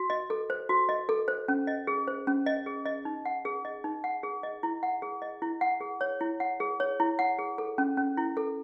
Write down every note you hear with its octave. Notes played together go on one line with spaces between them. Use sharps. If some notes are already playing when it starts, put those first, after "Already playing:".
Already playing: F#4
D#5
A4
C5
F#4
D#5
A4
C5
C#4
D#5
G#4
C5
C#4
D#5
G#4
D#5
D#4
F#5
G#4
D#5
D#4
F#5
G#4
D#5
E4
F#5
G#4
D#5
E4
F#5
G#4
C#5
E4
F#5
G#4
C#5
E4
F#5
G#4
A4
C#4
C#4
E4
A4